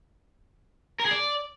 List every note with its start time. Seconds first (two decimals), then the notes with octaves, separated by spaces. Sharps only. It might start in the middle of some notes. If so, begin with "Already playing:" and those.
1.00 A#4
1.05 G#4
1.11 D5